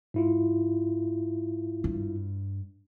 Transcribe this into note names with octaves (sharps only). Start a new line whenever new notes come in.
G#2 E4 F4
G2